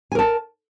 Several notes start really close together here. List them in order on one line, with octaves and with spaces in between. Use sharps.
G#5 A#4 A5